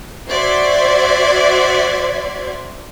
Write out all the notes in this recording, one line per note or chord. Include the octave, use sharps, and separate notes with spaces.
F#4 C5 D5 E5 C6 G#6